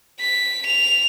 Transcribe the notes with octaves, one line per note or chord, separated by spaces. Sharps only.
B6
F7